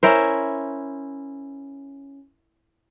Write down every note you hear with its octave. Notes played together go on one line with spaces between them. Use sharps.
C#4 E4 A#4 C5